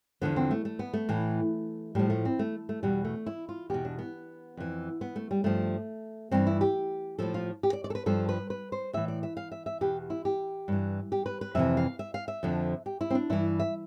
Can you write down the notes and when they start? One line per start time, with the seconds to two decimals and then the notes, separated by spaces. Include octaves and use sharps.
0.21 E2 D3 F3 B3
0.36 C4
0.51 A3
0.65 A3
0.79 B3
0.94 A3
1.09 A2 E3
1.95 A2 F3 G3
2.10 A3
2.25 C4
2.39 A3
2.69 A3
2.83 E2 B2 G3
3.05 A3
3.26 E4
3.49 F4
3.70 E2 B2 G4
3.85 D4
3.99 B3
4.57 F2 E3
5.01 B3
5.16 A3
5.31 G3
5.44 G2 F3 A3
6.31 G2 E3 C4
6.47 E4
6.61 G4
7.19 A2 F3 A4
7.34 F4
7.63 G4
7.73 D5
7.84 D5
7.90 A4
7.95 B4
8.06 G2 F3 A4
8.29 B4
8.50 B4
8.72 C5
8.93 A2 E3 E5
9.08 D5
9.23 E5
9.37 F5
9.52 E5
9.66 E5
9.81 E2 B2 G4
10.10 E4
10.25 G4
10.68 G2 E3
11.12 G4
11.26 B4
11.41 B4
11.55 F2 C3 E3 E5
11.77 F5
11.99 E5
12.14 F5
12.28 E5
12.43 F2 D3 F3
12.86 G4
13.01 E4
13.10 C4
13.15 D4
13.30 G2 E3 E4
13.60 E5